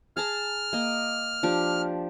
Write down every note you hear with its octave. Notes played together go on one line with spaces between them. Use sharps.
G#4 A5 A#5 F6
A#3 D#5
F3 D4 G4